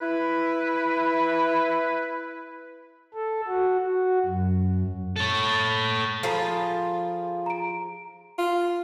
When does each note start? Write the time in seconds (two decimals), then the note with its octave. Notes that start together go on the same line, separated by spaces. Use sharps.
0.01 E4 B4
3.14 A4
3.48 F#4
3.81 F#4
4.25 F#2
5.16 A4 C#5
6.23 F3 F4 G#4 A4 A#5 B5
7.46 A#5 D7
8.38 F4